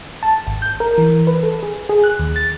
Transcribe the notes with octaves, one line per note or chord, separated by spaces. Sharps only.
A5
G#1
G6
A#4
E3
B4
A4
G#4
G#4
F#6
D#2
A6